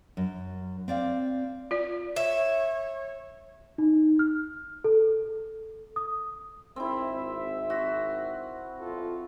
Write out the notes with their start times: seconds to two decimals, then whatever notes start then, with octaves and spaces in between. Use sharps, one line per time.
0.17 F#2
0.88 C4 D5 F5
1.71 F4 D5
2.16 C#5 E5
3.78 D#4
4.19 F6
4.84 A4
5.96 D#6
6.76 G#1 C4 E4 E5
7.70 F#4
8.79 G1 F4 A4